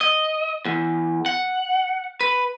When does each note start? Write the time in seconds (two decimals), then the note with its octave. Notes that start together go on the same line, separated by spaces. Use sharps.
0.01 D#5
0.65 E2
1.26 F#5
2.21 B4